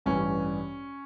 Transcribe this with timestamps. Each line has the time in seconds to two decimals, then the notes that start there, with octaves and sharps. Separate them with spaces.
0.06 A1 G2 E3 G3 C#4